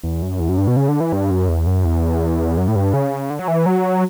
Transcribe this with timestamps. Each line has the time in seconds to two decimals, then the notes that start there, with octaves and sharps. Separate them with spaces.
0.04 E2
0.22 F#2
0.40 E2
0.49 F#2
0.58 G2
0.67 B2
0.77 C#3
0.88 D3
1.00 E3
1.13 G2
1.31 F#2
1.49 E2
1.67 F#2
1.85 E2
2.57 F#2
2.68 A2
2.76 G2
2.94 C#3
3.30 D3
3.39 F#3
3.48 E3
3.66 F#3